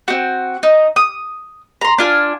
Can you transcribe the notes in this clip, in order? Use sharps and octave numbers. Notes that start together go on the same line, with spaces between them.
C4 F#4
D#4
D#6
A#5 C6
D4 F4 G#5